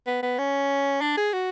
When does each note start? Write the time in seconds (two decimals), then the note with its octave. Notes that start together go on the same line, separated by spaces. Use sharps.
0.07 B3
0.23 B3
0.39 C#4
1.01 D4
1.17 G#4
1.33 F#4